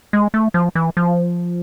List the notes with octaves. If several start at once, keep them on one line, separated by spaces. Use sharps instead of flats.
G#3
A3
F3
E3
F3